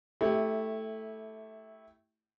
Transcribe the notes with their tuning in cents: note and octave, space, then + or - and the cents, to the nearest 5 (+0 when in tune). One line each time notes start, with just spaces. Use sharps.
A3 +0 E4 -15 G4 +0